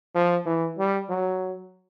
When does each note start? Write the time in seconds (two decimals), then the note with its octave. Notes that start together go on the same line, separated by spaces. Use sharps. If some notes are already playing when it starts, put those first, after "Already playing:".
0.15 F3
0.46 E3
0.78 G3
1.09 F#3